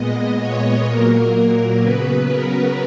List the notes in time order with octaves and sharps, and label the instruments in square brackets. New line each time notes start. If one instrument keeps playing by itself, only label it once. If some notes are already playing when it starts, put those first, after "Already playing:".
Already playing: [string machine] A#2 G#3 B3 D#5
C#5
A#2 F#3 A#3 A#4
A#4
C#3 F#3 B3 B4
A#4